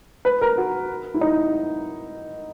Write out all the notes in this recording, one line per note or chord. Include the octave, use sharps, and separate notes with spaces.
B4
A#4
F#4
E4
D#4